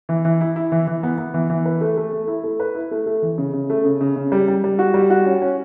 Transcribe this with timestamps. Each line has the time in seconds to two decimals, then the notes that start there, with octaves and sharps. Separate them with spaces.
0.09 E3
0.25 E3
0.41 E4
0.56 E4
0.72 E3
0.87 E3
1.03 B3
1.18 B3
1.34 E3
1.50 E3
1.66 B4
1.81 A3
1.97 A3
2.12 A3
2.28 E4
2.44 A3
2.60 B4
2.75 E4
2.91 A3
3.06 A3
3.22 E3
3.38 C#3
3.53 C#3
3.70 A3
3.85 C#3
4.01 C#3
4.16 C#3
4.32 G3
4.48 G3
4.64 G3
4.79 F#4
4.94 G3
5.10 F#4
5.26 C#4
5.42 C#4